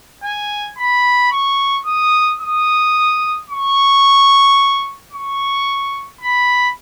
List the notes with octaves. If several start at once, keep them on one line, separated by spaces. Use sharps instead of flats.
G#5
B5
C#6
D#6
D#6
C#6
C#6
B5